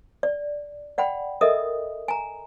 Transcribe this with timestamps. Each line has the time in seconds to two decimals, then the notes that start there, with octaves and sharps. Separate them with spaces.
0.23 D5
0.98 D5 F#5 G5 B5
1.41 A4 A#4 D#5 E5 D#6
2.08 G#5 A#5